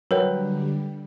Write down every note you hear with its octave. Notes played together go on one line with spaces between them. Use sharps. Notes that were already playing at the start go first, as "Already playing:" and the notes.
D3 F#3 G3 A#4 B4 C#5 G5